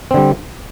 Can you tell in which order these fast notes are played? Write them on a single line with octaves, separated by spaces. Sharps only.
C4 D3 G3